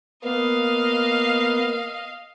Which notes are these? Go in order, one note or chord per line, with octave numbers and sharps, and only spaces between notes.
A#3 B3 D#5 F5